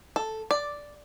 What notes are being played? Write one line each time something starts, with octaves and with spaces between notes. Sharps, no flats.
A4
D5